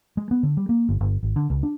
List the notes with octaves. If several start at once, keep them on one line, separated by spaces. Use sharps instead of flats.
G#3
B3
D3
G3
A#3
G1
G1
G#1
D3
C#2
D4